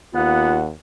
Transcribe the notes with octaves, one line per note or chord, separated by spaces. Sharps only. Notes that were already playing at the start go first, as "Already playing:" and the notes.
D#2 B3 F4 F#5